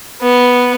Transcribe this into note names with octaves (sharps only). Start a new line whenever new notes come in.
B3